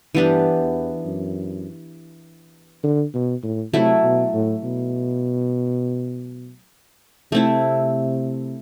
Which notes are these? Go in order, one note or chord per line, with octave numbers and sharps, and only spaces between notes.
G2 E3 B3 D4 G4
E2
F#2
D3
B2
A2
C3 F#3 A3 E4
B2
A2
B2
C3 A3 C4 E4